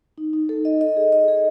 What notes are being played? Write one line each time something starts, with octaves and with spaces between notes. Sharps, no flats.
D#4
D#4
A4
D#5
D#5
G#4
D#5
G#4